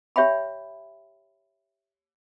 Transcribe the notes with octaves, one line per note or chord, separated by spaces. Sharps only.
G4 C#5 E5 G5 B5